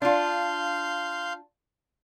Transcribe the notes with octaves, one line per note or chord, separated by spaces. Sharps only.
D4 F4 F5 C6 G6